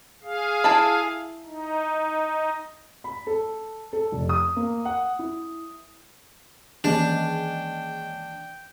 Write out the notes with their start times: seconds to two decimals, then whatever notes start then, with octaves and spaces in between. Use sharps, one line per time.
0.23 G#4 F5
0.64 E4 A5 B5
1.45 D#4
3.04 B5
3.27 A4
3.93 A4
4.12 F1
4.29 D#6
4.56 A#3
4.85 F#5
5.19 E4
6.84 D#3 E3 G#3 A#3 C#4 D4 G5